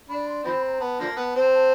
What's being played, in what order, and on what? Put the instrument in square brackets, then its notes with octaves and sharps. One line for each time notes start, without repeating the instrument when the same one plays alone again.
[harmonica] D4 [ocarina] B5
[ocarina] C6
[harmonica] D#3 F3 C4 [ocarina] B5
[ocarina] A#5
A#5
[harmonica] B3 [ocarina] A5
[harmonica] D3 F3 A#3
B3
C4
[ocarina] A5